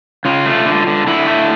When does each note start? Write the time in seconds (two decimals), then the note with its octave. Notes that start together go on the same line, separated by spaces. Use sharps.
0.25 C#3 F4
0.46 A3
0.66 D3
0.87 D3
1.07 D3 E4
1.27 A3